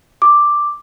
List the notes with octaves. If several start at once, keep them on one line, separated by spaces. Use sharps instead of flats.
D6